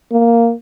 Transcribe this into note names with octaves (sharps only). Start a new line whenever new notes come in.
A#3